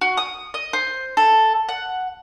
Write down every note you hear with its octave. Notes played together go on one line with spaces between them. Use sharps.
F#4
D#6
D#5
C5
A4
F#5